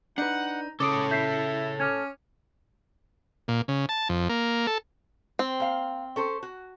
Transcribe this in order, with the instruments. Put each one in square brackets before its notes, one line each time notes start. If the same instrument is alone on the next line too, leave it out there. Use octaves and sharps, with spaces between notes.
[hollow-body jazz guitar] D4 B4 [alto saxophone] D#4 [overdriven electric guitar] F#5
[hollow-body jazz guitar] C#3 [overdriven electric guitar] A4 C#5 [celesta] D6 D#6 D7
[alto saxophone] E4 [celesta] G6 B6 C7
[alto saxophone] C#4 [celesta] D6 F6 G#6
[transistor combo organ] A#2
C#3
A5
F2
A#3
A4
[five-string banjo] C4
[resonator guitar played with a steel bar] A#3 F5
C#4 A4 C5
F#4